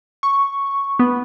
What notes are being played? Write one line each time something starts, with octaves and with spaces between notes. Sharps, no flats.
C#6
B3